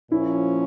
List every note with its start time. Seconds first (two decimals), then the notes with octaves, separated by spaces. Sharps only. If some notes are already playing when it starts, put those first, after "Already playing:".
0.11 A#2 F3 C#4 E4